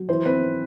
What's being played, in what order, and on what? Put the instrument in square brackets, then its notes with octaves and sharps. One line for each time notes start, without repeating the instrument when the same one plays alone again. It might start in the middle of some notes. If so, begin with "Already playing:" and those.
Already playing: [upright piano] F#3
[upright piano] E3 [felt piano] C5
[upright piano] C4 [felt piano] B4